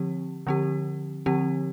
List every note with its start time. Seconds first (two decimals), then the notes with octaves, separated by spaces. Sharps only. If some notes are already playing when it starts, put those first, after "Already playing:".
Already playing: D3 F3 C4 G4
0.47 D3 F3 C4 G4
1.26 D3 F3 C4 G4